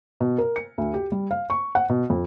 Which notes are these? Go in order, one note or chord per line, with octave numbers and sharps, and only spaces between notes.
B2
A#4
C#7
D2
G4
G3
F5
C#6
F#5
B2
F2